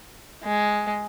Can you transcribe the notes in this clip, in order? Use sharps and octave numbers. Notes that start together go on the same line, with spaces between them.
G#3